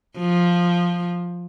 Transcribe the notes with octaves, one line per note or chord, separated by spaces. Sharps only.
F3